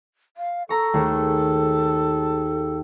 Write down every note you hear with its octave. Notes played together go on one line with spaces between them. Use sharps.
F5
A4 A#5 C#6
D#2 A3 G#4